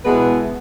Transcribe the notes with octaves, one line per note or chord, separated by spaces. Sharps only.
B2 G#3 B3 E4 B4